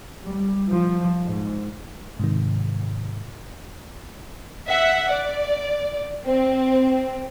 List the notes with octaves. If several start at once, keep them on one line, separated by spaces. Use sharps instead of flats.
G3
F3
G#2
G#2 C3 D#3
E5 F#5
D5
C4